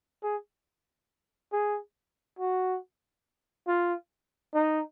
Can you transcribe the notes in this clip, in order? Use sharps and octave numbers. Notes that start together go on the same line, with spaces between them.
G#4
G#4
F#4
F4
D#4